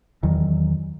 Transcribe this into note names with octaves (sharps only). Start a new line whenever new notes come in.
E2 D#3 E3 F#3